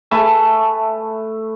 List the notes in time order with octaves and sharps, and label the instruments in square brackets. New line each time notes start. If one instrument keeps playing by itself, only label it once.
[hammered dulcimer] A3 B4 [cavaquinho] E5 G#5 A5